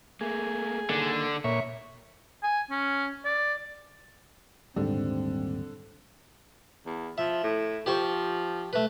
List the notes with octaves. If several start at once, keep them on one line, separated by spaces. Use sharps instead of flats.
A3 A#3 G#4
A#2 D3 D#3 A#3
A#2 C#5 E5
G#5
C#4
D5
D#1 G#2 D3 G3 C4
E2
F3 E5
A2
F3 G4 C5 C#6
A3 B4